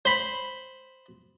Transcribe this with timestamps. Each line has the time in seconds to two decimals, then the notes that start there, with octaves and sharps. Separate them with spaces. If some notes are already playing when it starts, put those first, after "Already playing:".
0.05 C5 B5